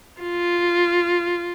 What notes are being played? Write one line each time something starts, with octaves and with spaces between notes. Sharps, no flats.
F4